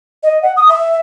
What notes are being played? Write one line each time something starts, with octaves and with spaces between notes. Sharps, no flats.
D#5
F#5
D#6
E5